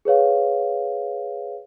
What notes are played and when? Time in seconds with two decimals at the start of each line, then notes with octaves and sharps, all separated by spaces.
0.05 G#4 B4 C#5 F5